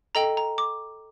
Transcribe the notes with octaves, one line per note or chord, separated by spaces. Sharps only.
A4 D#5 G5 A#5
A#5
D6